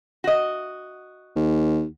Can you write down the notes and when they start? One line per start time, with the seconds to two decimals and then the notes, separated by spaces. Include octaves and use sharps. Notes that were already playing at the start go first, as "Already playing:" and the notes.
0.24 F#4 D#5
1.36 D#2